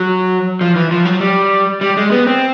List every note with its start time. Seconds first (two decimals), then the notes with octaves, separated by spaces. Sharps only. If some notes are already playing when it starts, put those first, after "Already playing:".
Already playing: F#3
0.61 F3
0.76 E3
0.91 F3
1.05 F#3
1.20 G3
1.81 G3
1.97 G#3
2.11 B3
2.27 C4